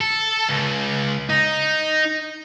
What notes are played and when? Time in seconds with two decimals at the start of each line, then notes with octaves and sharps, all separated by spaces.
0.01 A4
0.49 C#2
1.30 D#4